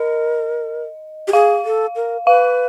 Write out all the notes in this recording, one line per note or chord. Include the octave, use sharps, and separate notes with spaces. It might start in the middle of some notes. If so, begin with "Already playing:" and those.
Already playing: A#4 D#5
G4
G#4 F5
A4
A#4
B4 F5